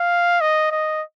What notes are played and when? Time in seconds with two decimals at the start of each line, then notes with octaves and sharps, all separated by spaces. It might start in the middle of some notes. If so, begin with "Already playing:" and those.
Already playing: F5
0.41 D#5
0.71 D#5